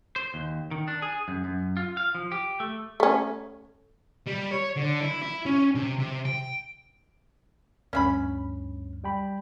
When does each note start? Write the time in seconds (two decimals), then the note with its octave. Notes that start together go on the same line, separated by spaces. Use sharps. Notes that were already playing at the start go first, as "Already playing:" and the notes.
0.16 C5
0.34 D#2
0.71 D#3
0.88 D4
1.02 G#4
1.28 F#2
1.44 F#2
1.77 F4
1.97 F5
2.15 F3
2.32 G4
2.60 A3
3.00 A3 C#4
4.26 G3
4.51 C#5
4.76 D3
5.01 E4
5.23 E4
5.46 C#4
5.75 C3
5.98 C3
6.25 G5
7.93 D2 G2 C#4 E5 B5
9.04 G3 G5 B5